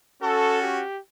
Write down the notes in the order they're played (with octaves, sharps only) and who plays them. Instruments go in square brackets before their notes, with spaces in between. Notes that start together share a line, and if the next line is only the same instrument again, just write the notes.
[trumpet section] C#4 F#4 A4
G4